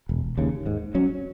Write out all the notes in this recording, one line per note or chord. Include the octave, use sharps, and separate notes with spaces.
E1
D#2 C#3
G#2
F#3 C#4